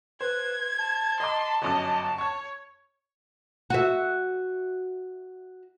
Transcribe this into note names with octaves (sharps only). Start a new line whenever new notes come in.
B4 C5 G#6
A5
D#5 A#5 C6 D6
G1 F#2 D#5 D6
C#5 C#6 G#6
F#4 E5